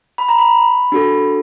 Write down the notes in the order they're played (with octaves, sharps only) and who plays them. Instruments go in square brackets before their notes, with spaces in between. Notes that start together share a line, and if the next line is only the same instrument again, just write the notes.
[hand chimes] B5
A#5
B5
D4 F#4 A4